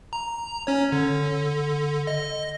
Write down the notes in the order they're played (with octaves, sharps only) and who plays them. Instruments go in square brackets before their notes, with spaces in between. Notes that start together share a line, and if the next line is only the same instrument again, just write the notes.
[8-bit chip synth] A#5
C#4 C#5
D3
D#5